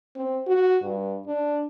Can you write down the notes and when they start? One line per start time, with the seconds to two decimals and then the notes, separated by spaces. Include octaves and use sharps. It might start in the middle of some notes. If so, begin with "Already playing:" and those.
0.16 C4
0.47 F#4
0.83 G2
1.27 D4